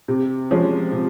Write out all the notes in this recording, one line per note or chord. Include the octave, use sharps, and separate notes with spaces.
C3
F3 G#3 C#4
C3